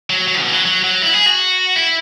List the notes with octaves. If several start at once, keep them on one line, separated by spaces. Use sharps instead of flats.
F#3
F#3
B2
E3
F#3
F#3
F#3
E4
G#4
F#4
E4